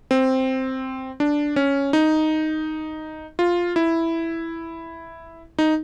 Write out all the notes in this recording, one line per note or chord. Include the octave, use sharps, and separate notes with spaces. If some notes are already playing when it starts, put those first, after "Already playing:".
C4
D4
C#4
D#4
F4
E4
D#4